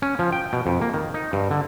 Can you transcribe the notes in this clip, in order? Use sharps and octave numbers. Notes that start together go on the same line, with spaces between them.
C#4
F3
G5
B2
F2
A#3
D#3
D#4
G2
D3